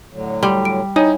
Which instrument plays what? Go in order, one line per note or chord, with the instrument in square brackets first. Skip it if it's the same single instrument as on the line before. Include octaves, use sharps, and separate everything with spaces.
[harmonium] A2 D3 F#3
[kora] G3 [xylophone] C6
[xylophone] D7
[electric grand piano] D#4 [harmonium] E4 [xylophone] C#5 G#5 D#6